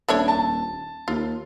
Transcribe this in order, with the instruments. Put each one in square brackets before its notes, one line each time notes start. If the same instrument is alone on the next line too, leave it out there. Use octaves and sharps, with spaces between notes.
[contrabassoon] D#1 [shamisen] A3 D4 C#5
[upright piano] A5
[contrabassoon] D#2 [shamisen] F4